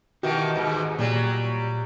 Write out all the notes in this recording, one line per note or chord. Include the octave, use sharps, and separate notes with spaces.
B2 D#3 E3 F#4 G4
D#2 G#2 B2
A#2 F#3 G3